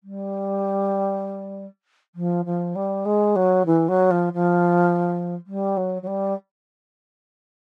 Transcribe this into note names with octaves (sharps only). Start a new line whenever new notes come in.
G3
F3
F3
G3
G#3
F#3
E3
F#3
F3
F3
G3
F#3
F#3
G3